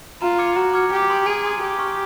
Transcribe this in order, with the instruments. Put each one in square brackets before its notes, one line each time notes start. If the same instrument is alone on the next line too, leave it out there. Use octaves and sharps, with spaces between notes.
[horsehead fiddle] F4 [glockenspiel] A#5
[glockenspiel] D6 F6 G#6 C#7
[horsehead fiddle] F#4 [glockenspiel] A#5
[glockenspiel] D6 F6 G#6 C#7
[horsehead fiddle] G4 [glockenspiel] G#5
[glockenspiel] C6 D#6 G#6
[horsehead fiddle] G#4 [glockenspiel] G#5
[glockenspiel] C6 D#6 G#6
[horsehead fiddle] G4 [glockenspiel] G#5
[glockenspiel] C#6 F6